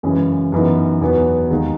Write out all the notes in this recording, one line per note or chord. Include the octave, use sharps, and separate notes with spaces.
F#2 C#3 E3 G#3 C#4
F#2 E3 B3 D#4
E2 B2 F#3 B3
D#2 D#3 G#3